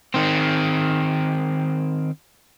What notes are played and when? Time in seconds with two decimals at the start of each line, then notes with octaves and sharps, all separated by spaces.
0.14 D#3 C4